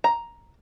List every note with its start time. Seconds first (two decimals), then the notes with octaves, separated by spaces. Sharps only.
0.04 A#5